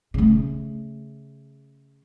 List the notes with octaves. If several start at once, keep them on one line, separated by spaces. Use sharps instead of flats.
C#3 A3